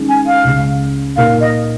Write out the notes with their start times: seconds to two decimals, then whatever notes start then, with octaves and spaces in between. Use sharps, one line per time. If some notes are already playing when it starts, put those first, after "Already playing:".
Already playing: D#3 G#3 C#4
0.09 G#5
0.26 F5
0.44 C#2 C#3 G#3
1.16 A#2 A#3 D#4 A#4 F5
1.41 D#5